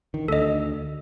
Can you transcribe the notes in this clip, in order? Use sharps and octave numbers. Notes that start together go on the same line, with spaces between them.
D#3
D2 A4 D#5